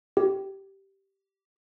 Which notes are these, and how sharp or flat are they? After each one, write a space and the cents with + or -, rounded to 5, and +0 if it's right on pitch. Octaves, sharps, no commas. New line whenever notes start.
G4 -10